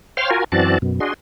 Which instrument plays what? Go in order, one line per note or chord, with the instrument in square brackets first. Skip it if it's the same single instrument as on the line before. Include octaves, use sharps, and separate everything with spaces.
[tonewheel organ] C5 C#5 F5 G5 C6 F6
F4 F#4 A#4 G#5
F#2 E3 C4 F#4 D5 A5
F#2 B2
D4 F#4 G#4 D#5 C6